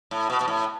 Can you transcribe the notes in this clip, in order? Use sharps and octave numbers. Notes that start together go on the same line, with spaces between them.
A2
B2
B2
A2